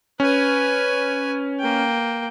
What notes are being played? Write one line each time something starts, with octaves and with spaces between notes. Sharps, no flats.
C#4 B4 G#5
A#3 G5